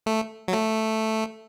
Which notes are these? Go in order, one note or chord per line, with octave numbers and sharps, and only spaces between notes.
A3
F#3
A3